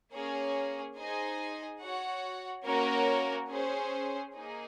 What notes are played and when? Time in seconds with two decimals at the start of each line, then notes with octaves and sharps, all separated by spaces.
0.13 A#3 C#4 G#4 C#5
0.97 D#4 G#4 C5 D#5 G#5
1.81 F#4 C#5 F#5
2.65 A#3 C#4 F#4 A#4 C#5
3.50 C#4 G#4 C5
4.34 A#3 D#4 G#4